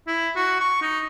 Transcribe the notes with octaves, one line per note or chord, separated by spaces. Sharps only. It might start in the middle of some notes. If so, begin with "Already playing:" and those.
E4
F#4
C#6
D#4